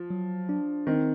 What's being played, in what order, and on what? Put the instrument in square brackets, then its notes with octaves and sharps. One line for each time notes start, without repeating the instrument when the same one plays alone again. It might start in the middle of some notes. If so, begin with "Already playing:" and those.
Already playing: [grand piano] F3
[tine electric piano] F#3
D4
[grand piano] D#3 [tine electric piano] C4